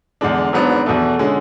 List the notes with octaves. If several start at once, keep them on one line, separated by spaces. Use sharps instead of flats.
E2 D3 G#3 D4
G#1 G#2 F#3 B3 D4
E2 B2 A3
D3 G#3 C#4